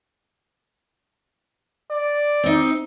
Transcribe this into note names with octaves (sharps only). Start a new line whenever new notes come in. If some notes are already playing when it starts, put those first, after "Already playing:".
D5
C4 D#4